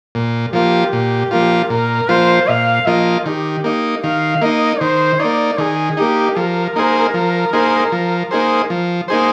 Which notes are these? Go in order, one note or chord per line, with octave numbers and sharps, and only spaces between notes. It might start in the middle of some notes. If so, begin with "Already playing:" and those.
A#2
F3 A#3 F4 G4
A#2
F3 A#3 F4
A#2 A#4
F3 A#3 F4 C5
A#2 F5
F3 A#3 F4 D#5
D#3 G4
A#3 D#4
D#3 F5
A#3 D#4 D#5
D#3 C5
A#3 D#4 D5
D#3 G#4
A#3 D#4 G4
F3 A#4
A#3 D#4 G#4 C5
F3
A#3 D#4 G#4 C5
F3
A#3 D#4 G#4 C5
F3
A#3 D#4 G#4 C5